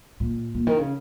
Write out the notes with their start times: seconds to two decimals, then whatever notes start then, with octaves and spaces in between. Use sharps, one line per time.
0.20 A#2
0.54 A#2
0.67 D#3
0.78 C#3